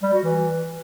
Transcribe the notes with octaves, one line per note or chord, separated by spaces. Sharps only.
G3
F#4
E3